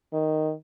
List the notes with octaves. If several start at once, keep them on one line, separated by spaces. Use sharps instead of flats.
D#3